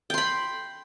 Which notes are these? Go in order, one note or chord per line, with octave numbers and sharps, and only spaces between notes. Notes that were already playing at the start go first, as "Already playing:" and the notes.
G5 B5 C6